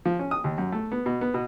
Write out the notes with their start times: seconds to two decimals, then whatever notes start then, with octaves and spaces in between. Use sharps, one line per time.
0.05 F3
0.19 C#4
0.31 D#6
0.44 D#2
0.58 F#2
0.72 A3
0.92 B3
1.06 B2
1.21 B3
1.34 B2